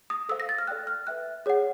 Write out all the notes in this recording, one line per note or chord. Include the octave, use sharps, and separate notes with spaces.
D#6
A4 C5 F5 E6
A#6
A6
F6
A4 D5 G5 F#6
F6
B4 E5 G5 F#6
G#4 C#5 F#5